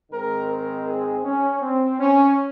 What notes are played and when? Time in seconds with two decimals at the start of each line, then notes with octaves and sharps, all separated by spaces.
0.11 G#2 D#3 G#3 C4 A#4
0.49 A#4
0.86 G#4
1.24 C#4
1.62 C4
2.00 C#4